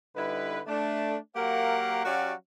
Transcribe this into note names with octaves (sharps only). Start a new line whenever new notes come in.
D3 G3 D#4 E4 B4
A3 D4
F#3 A#3 G4 A#4 F5 F#5
F#3 C#4 F#4 G4 D5 F5